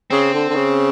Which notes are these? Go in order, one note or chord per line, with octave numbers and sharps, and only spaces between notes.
C#3 C4
D3
D3
C#3